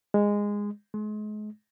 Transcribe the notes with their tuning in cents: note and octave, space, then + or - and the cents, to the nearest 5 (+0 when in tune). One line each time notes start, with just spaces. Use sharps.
G#3 -15
G#3 +35